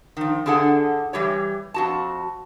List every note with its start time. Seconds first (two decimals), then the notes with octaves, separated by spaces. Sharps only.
0.17 D#3 F3
0.46 D3 E4 G#4 A4 F#5
1.13 E3 G3 G4 C#5
1.74 F2 F#4 A5